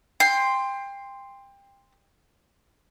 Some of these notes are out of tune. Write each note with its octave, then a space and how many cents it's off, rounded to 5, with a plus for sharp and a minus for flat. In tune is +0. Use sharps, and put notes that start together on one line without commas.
G5 +25 C6 +0